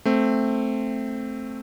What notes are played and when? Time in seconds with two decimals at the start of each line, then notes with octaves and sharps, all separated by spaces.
0.05 A3 C4